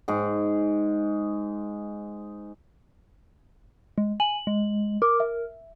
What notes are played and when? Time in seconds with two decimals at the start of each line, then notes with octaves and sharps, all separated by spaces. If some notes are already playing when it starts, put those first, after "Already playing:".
0.08 G#2 G#4
3.98 G#3
4.20 G#5 F#7
4.47 G#3
5.02 A#4 D6
5.20 E5